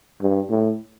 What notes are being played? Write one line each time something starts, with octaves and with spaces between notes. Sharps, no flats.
G2
A2